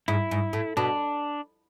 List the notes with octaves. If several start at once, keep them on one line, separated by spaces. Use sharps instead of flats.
G#2 E4
G#2
A2
B2 D4